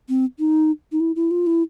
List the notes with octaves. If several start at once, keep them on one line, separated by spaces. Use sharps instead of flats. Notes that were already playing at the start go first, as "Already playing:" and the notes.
C4
D#4
D#4
E4
E4
F4
E4